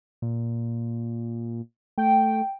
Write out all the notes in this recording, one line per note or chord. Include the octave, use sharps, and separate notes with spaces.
A#2
A3 G5